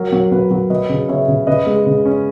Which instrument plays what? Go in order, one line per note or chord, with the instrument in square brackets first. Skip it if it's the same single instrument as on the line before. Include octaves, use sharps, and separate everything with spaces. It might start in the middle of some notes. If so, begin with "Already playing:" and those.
Already playing: [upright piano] F#3 A#4
F#3
F#3 B4
F#3
F#3 B4 D#5
C#3
C#3 C#5 E5
C#3
C#3 B4 D#5
G#3
C#3
C#4